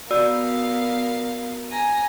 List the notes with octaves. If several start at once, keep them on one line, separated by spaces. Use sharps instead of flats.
B3 F#4 A#4 D5 F5 E6
G#5 A#5